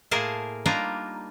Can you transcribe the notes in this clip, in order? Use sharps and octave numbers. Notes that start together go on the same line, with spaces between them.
A2 A#3 G#4 A#4 C5 A5
G3 A#3 D4 D#4 F4 A#5